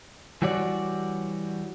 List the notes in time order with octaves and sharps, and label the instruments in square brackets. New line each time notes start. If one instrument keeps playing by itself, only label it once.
[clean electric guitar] E3 G3 F#4 C#5 D5